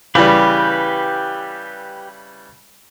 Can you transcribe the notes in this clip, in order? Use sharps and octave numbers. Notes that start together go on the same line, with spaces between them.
C#3 E3 G3 G4 B4